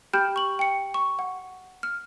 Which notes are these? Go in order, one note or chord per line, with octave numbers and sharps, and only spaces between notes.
G4 G5 B5 F6 G6 D7
C#6 F#7
G5 C#7
C#6
F#5
F6